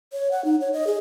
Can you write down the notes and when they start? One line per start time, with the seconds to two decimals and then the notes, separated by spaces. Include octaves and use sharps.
0.13 C#5
0.31 F#5
0.45 D#4
0.61 C#5
0.73 D#5
0.87 G#4